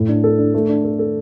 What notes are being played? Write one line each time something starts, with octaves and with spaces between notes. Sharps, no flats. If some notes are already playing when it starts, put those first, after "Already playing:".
Already playing: A2
D4
A4
D4
A3
D4
A4
A4